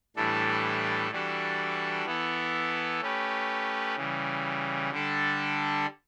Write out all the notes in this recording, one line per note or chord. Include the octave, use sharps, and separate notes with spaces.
A2 E3 G3 D4 A4
E3 G3 D4 F#4 A4
E3 B3 E4 A4
A3 C#4 G4 B4
C#3 E3 G3
D3 G3 D4 A4